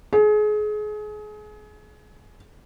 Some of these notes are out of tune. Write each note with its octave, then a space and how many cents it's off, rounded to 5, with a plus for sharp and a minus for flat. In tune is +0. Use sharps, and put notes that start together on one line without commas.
G#4 +30